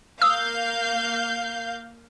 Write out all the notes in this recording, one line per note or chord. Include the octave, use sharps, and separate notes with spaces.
A#3 F5 D#6 E6 G6